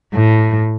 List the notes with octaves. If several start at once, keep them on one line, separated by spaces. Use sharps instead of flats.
A2